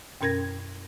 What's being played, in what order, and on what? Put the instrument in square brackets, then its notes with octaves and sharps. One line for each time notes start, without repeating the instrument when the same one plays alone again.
[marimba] F#2 B2 C#4 A#4 G#6 A#6